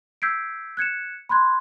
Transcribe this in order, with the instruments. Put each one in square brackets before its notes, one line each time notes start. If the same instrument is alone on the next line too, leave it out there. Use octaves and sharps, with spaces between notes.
[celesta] E6 G6 G#6 B6 C7 D7
F#6 G#6 C#7 E7
B5 C6 F#6 G#6